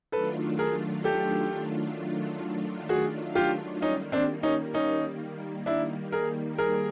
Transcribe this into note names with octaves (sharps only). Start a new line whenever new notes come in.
D#3 F#3 A3 D4 F4 A4 B4
G#4 A#4
G4 A4
F#4 G#4
F4 G4
D#3 G3 A#3 C#4 D#4
C4 D4
C#4 D#4
C#4 D#4
D4 E4
G#4 A#4
G#4 A#4